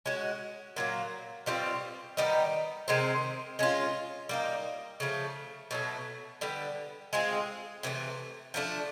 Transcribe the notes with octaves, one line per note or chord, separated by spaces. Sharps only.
G#3 C#4 F#4
A#2 F#3 A#3
B2 G3 C4 F4
D#3 G3 B3 D#4
C3 D#3 G#3 C4
G#3 C#4 F4
G3 A#3 D#4
C#3 F3 A3
B2 F#3 A3
D3 G3 B3
G#3 C4 F4 G#4
C3 E3 A3
F3 A3 D4